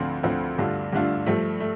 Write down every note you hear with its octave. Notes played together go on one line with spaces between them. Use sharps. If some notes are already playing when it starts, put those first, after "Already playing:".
Already playing: D2 D3 F3 C4 F4
D2 D3 F3 C4 F4
G2 D3 A3 D4 F4
G2 D3 A3 D4 F4
G2 F3 A3
A3